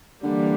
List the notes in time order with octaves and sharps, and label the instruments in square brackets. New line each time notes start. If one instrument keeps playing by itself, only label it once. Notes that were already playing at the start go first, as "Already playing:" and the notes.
[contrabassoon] D3 [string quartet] E3 G3 A#3